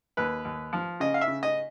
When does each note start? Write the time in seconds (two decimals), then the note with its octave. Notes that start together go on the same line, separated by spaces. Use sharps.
0.17 D#2 B4
0.45 D#2
0.73 F3
1.00 C#3 D#5
1.14 F5
1.21 E5
1.28 C#3
1.43 D#5